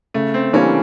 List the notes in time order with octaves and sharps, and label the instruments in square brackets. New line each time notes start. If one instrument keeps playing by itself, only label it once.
[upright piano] C#3 [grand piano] A3
[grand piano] C4
[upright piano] E3 G3 A#3 D4 [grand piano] C#4